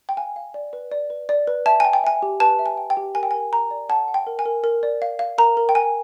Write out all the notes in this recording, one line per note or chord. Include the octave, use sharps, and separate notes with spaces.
G5
F5 G#5
F5
D5
B4
D5
B4
D5
B4
E5 A5
G5 G#5
G5
E5 G#5
G4
B4 A5
E5
G#5
G5
G5
G4
A#4 G#5
G5
G#5
A#4
A#4 A#5
D5
F#5 A5
F#5
G5
A#4
G#5
A#4
A#4
D5
F5
F5
A#4 A#5
A#4
G5
A#4 G#5